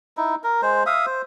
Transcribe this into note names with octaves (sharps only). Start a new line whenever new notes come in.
D#4 E4
A#4
G#3 C5
E5 F5 D#6
C5